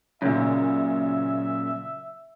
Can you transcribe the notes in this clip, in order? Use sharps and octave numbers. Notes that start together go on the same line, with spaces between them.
F#2 A#2 C#3 E5